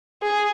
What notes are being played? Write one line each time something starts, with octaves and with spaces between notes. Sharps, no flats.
G#4